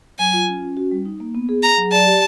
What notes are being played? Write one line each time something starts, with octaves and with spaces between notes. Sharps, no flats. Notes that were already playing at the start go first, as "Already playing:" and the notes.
F#3 G#5
F4
C#4
C#4
F#4
G3
D#4
A#3
B3
G#4
G#4 A#5
F#3
D5 A5
G4